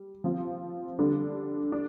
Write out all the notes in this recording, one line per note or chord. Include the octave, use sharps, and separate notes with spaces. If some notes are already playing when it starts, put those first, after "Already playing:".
Already playing: G3
F3 C4 F4
D3 G3 D4
D4